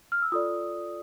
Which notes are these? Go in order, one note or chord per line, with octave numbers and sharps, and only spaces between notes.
F6
E6
F4 A4 D5 D#6